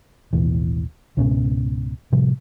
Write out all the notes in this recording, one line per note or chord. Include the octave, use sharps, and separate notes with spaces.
A1 D#2 B2 E3
C#2 G#2 B2 C#4
A2 C3 F3 G3